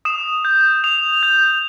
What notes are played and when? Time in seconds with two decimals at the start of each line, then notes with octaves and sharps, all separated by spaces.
0.05 D#6 E7
0.45 G6
0.84 D#6 F7
1.23 G6